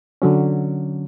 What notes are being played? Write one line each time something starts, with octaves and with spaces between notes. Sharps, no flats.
D3 F#3 C#4